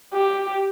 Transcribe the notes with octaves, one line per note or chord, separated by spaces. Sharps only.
G4